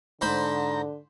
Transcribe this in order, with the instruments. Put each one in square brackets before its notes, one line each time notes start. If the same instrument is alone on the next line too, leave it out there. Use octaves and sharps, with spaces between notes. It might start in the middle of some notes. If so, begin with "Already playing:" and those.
[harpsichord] G#2 C5 B5 [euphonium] D3 [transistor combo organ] A#5